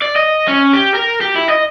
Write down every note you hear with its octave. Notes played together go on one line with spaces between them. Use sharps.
D5
D#5
C#4
G4
A#4
G4
E4
D#5